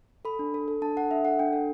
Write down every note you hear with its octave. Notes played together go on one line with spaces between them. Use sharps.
A4 B5
D4
A4
A4
D4 A5
A4 F#5
D4 E5
A4 F#5
D4 G5
A4